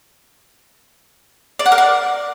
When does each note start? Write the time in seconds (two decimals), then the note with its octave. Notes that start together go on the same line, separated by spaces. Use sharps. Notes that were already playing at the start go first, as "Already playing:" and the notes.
1.59 D5
1.66 F#5
1.72 A#4
1.78 D5